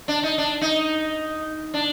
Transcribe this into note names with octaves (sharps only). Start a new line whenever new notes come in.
D4
D#4
D4
D#4
D4